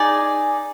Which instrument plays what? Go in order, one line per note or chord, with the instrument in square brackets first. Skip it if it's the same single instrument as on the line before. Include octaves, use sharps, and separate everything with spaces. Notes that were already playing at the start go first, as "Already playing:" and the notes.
Already playing: [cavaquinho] D#4 G#4 D5 G#5